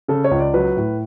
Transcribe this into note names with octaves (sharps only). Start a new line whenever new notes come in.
C#3 A4
C#5
C#2
D5
F#3 B4
A2